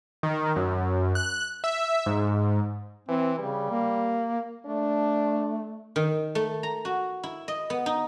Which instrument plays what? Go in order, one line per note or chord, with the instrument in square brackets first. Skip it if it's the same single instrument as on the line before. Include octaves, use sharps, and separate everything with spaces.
[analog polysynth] D#3
F#2
F#6
E5
G#2
[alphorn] E3 [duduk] C4
[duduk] C#3 [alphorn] G3
[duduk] A#3
[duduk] A3 [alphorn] D4
[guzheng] D#3
A3
A#5
F#4
E4
D#5
B3
D#4